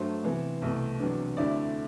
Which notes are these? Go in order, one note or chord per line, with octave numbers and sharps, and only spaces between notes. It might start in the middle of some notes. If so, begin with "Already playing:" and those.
Already playing: G2 F#3 A3 C5
C3 E3 B3
C2 B2 A3
E2 C3 F#3 B3 D4
D2 D3 A3 C4 E4 D5